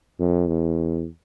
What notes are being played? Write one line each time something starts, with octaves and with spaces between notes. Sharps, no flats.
F2
E2